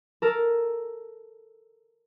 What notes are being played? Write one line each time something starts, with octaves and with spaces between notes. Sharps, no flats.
A4 A#4